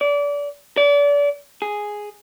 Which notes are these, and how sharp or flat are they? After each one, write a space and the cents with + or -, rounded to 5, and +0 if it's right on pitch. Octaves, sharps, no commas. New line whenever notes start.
D5 -30
D5 -35
G#4 +0